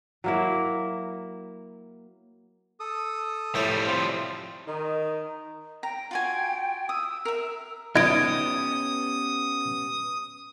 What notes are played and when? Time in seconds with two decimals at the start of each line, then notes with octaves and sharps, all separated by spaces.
0.24 F#3 A#3 E4
2.80 A4 D#6
3.55 A2 F3 G3 A3
3.87 C4 F4
4.67 D#3 D#4
5.83 G5 A#5
6.11 F4 F#4 G#5
6.89 D#6 E6
7.25 A#4 E5
7.96 B3 C#4 D#4 G4 D#6 G#6 D7